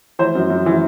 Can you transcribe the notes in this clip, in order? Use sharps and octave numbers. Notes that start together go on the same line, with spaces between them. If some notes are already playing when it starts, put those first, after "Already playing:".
E3 C5
F#2
F#2
E3